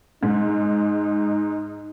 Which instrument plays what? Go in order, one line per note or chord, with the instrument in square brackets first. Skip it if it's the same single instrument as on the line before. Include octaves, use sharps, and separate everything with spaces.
[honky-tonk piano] G#2 [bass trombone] D#4